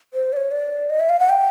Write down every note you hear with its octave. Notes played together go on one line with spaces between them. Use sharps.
C5
D5
C#5
D5
D#5
E5
F5
F#5
G5